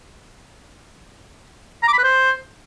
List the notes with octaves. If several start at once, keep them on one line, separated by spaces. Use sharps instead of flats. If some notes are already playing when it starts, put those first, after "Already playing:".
A#5
D6
B5
B4
C5